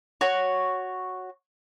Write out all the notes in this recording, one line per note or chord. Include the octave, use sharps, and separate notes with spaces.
F#4 C#5